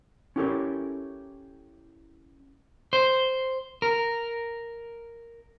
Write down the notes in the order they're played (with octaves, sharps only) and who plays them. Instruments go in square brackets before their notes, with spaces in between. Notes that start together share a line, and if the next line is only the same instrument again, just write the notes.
[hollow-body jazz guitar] C#4 E4 G4 A4 A#4 C#5
[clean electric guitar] C5
A#4